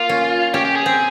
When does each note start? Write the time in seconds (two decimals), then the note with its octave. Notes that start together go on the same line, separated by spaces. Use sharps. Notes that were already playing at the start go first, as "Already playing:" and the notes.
Already playing: A#3 F4
0.09 C#4
0.54 C#4 G4
0.65 G4
0.75 G#4
0.86 C4